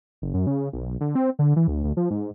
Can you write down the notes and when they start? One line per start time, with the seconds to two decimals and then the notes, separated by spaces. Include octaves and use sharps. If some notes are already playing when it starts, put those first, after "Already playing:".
0.22 F#1
0.34 F#2
0.47 C#3
0.73 B1
1.01 D3
1.15 C4
1.39 D3
1.56 E3
1.68 D2
1.84 D2
1.97 F3
2.11 G#2